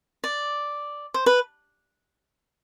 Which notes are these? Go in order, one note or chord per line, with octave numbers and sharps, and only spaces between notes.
D5
C5
B4